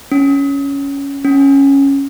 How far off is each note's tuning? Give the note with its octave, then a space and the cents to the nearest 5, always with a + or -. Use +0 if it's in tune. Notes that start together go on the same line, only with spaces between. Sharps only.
C#4 +10
C#4 -5